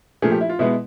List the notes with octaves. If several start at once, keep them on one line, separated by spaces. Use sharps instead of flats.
A#2 F3 A3 G#4
G4
E4
F4
B2 G#3 B3 E4